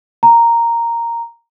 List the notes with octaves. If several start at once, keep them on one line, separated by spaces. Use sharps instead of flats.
A#5